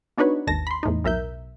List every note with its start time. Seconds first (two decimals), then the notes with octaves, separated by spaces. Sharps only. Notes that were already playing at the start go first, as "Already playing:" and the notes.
0.18 B3 D4 D#4 F#4 B4 C#5
0.47 G#1 D#2 A5 A#6
0.67 B5 C6
0.83 E2 A2 D#4
1.04 B1 A#4 E5 G6